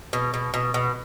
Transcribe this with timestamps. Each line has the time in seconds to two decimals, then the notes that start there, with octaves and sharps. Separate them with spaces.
0.13 B2
0.34 B2
0.54 B2
0.74 B2